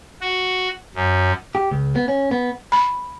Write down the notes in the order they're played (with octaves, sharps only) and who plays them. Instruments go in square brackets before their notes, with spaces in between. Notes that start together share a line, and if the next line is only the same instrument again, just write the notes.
[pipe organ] F#4
F#2
[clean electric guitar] G4
C#2
B3
C#4
B3
[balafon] B5